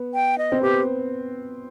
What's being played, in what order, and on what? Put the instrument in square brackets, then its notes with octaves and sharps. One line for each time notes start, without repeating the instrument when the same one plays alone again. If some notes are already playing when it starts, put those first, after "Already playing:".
Already playing: [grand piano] B3
[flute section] G5
D#5
[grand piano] C4
[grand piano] B3 [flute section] G4